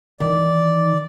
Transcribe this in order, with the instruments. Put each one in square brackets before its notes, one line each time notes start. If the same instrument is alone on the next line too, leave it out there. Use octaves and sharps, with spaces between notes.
[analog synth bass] D#3 [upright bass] E3 [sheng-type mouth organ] D5